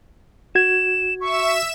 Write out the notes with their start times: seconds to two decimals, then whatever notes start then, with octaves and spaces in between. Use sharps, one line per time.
0.55 F#4 G#6 E7
1.21 E5 C#6 E7